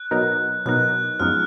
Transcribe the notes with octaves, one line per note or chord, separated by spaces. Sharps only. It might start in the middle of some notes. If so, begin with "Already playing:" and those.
Already playing: F#6
B2 F#3 B3 D#4 A#4
B2 F#3 B3 D#4 A#4 F#6
F#2 F3 G#3 B3 D#4 F6